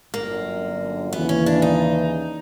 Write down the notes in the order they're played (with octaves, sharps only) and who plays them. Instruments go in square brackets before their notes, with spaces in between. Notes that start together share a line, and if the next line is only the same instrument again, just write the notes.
[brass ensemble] G1 F#2 D3 [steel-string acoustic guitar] A#3
[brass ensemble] D#2 C#3 E3 [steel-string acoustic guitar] B3
[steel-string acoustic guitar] C#4
D4
D#4